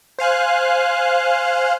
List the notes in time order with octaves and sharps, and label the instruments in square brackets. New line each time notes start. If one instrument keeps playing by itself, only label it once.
[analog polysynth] C5 F5 G#5 F#6